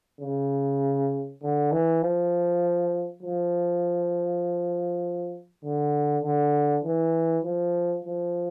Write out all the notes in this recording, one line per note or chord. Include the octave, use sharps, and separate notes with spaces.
C#3
D3
E3
F3
F3
D3
D3
E3
F3
F3